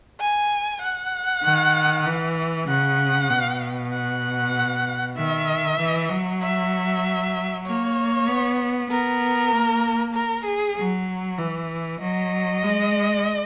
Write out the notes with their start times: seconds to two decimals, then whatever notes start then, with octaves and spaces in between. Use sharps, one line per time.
0.20 G#5
0.82 F#5
1.44 D#3
2.06 E3
2.68 C#3 F#5
3.30 B2
3.93 F#5
5.17 D#3 E5
5.79 E3
6.10 F#3
6.42 E5
7.65 A#3 C#5
8.27 B3
8.90 B3 A#4
9.52 A#3
10.14 A#4
10.45 G#4
10.76 F#3
11.38 E3
12.00 F#3 D#5
12.63 G#3